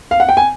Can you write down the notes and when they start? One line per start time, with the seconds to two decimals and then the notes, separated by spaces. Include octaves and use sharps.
0.11 F5
0.20 F#5
0.29 G5
0.37 G#5